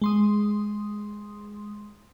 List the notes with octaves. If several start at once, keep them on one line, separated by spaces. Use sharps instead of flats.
G#3 C6 D#6